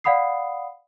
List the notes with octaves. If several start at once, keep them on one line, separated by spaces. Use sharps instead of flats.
D5 F5 F#5 B5 D#6 C7